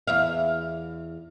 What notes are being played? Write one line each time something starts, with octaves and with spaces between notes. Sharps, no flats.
E2 E5 F5